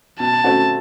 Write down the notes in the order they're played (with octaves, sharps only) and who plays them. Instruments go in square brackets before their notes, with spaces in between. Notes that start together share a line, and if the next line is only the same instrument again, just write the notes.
[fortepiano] B2 [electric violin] A5
[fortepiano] A3 C4 F#4